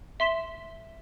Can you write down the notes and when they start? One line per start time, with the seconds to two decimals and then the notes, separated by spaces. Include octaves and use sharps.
0.20 E5 C6 B6 E7 G7